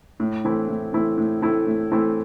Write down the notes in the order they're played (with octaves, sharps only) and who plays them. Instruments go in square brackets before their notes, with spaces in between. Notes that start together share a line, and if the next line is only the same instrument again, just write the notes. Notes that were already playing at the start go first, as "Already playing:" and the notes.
[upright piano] A2
E3 A3 C4 E4
A2
E3 A3 C4 E4
A2
E3 A3 C4 E4
A2
E3 A3 C4 E4